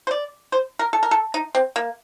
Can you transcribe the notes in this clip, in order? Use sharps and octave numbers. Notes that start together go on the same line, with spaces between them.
C5
D5
C5
A#4
A4
A#4
A4
D#4
C4
A#3